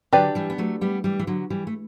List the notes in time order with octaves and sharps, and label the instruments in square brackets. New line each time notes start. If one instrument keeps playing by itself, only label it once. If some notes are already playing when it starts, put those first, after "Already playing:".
[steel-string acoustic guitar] D3 F#3 [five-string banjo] D4 G4 B4 D5
[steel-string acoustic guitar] E3 G3
B3
F#3 A3
G3 B3
E3 G3
E3
D3 F#3
E3 G3
A3